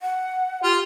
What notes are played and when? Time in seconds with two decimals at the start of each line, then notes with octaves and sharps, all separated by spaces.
0.02 F#5
0.63 F4 G4